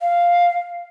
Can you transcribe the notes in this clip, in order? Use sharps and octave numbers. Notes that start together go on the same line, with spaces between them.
F5